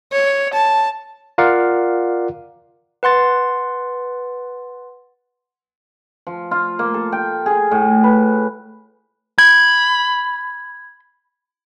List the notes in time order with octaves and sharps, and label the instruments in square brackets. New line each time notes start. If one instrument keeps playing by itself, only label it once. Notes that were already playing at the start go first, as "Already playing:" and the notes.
[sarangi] C#5
A5
[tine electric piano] F4 A#4 D5 F5 F#5
[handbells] B4 F#5 C6 A6
[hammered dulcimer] F3
F4
A#3
A4
G5
G#4
A2
B4
[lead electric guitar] B5 [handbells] G#6